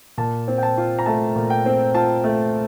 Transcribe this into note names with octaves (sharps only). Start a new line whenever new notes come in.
A#2 A5
C4
G5
A5
F4
A#5
A3 A5
A#2
G5
C4
F4 A5
A3